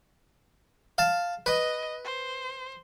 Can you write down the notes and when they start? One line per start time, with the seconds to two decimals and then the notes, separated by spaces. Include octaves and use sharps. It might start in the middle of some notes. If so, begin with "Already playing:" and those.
0.98 F5 A5
1.46 B4 D#5
2.04 C5